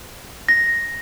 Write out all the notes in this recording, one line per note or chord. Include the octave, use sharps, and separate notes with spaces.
A#6